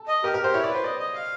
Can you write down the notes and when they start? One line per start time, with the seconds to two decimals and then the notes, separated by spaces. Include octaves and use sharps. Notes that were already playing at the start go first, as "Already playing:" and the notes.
Already playing: A4
0.08 D#5
0.24 G4 A#4
0.34 A#4
0.39 G4 C5
0.54 E4 C#5
0.64 D5
0.69 B4
0.75 C5
0.84 D5 D#5
1.00 D#5
1.14 F5